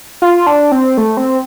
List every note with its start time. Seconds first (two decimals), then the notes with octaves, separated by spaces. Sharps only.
0.22 F4
0.47 D4
0.72 C4
0.97 A3
1.17 C4